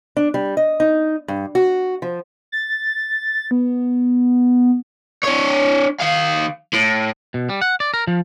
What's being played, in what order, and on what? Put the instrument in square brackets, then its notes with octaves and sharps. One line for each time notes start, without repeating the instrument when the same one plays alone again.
[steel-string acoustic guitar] D4
G3
D#5
D#4
G2
F#4
F3
[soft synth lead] A6
B3
[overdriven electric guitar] D4 C#5
D#3 F5
A2
[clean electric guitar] B2
G3
F#5
D5
A#4
F3